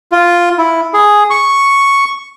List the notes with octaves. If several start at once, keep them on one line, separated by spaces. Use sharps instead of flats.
F4
E4
G#4
C#6